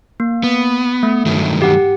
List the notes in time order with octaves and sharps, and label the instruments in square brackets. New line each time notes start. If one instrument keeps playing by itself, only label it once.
[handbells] A#3
[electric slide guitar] B3
[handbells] A3
[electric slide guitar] G2 D#3 F#3
[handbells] G4 F#5